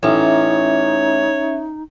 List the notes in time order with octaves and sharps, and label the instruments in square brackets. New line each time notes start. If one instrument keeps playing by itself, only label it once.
[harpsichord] A1 [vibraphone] C#4 E5 [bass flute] D#4 [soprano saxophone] C#5